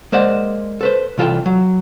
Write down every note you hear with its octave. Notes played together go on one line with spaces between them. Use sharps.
G#3 A#3 C5 D5 F#5
A4 B4 C5
C2 E3 F4 A4 G5
F#3